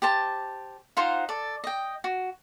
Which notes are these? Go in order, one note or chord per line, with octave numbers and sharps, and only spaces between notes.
G4 C5 A5
D#4 F4 C5 F#5
A4 D5
D#5 G5
F#4